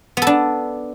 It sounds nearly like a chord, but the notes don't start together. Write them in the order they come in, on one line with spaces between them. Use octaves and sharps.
B3 A4 D4